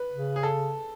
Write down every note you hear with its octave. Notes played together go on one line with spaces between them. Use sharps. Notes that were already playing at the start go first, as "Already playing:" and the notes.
Already playing: B4
C#3
G#4
A4